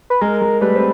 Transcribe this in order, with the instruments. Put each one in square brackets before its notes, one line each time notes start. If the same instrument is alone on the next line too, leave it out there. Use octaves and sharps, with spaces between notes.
[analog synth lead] B4
[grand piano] G#3 [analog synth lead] A#4
[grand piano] G#3
[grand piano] G3 A3 [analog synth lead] B4
[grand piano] C4